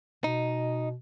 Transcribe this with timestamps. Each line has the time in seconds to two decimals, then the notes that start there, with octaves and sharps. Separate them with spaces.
0.24 B2 D#4